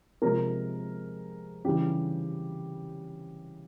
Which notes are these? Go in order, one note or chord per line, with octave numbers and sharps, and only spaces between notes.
C3 F3 G#3 A#4
C#3 E3 G3 G4